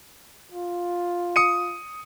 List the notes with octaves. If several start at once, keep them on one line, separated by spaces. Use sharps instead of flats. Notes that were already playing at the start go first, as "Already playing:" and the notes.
F4
D#6 C#7 D#7